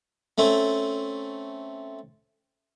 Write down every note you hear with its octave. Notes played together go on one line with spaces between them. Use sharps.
A3 C4 C#4